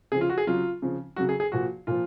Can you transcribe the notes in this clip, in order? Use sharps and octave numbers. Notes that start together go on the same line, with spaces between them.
C#3 F3 G#4
F4
F#4
G#4
C#3 F#3 F4
C#3 F3
C#3 F#3 F#4
G#4
G#4
A#2 F3 F#4
A#2 F3 F4